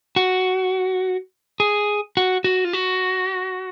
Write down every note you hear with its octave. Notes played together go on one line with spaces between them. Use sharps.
F#4
G#4
F#4
F#4
F4
F#4